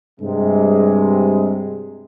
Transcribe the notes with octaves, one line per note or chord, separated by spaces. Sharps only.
G2 C3 G#3